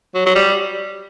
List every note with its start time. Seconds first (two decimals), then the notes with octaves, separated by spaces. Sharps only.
0.15 F#3
0.26 F#3
0.35 G3